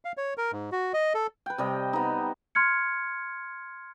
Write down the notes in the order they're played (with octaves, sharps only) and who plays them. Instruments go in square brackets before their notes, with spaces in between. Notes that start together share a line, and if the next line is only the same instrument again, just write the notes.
[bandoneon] F5
C#5
A#4
G#2
F#4
D#5
A4
[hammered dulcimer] B4 G5
C3 G3 D#5
B3 D#4
[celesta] C6 F6 G#6 C#7